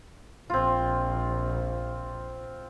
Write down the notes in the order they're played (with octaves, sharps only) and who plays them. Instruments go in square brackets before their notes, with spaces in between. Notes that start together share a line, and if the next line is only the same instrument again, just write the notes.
[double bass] A#1 [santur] C4 F4